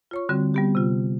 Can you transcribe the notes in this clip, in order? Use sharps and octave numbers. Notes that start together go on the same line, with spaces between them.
F4 C#5 C#6
D3 G3 C4 F#4
G3 B3 G4
C3 F4